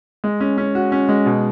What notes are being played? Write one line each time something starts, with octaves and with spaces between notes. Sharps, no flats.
G#3
C#4
C#4
F#4
C#4
G#3
B2